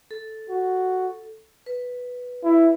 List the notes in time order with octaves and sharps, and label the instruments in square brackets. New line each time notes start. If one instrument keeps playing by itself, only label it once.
[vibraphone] A4
[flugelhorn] F#4
[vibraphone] B4
[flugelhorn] E4